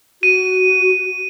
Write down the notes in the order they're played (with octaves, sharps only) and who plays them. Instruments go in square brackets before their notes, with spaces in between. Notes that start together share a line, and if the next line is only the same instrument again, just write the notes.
[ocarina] F#4 [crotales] D#7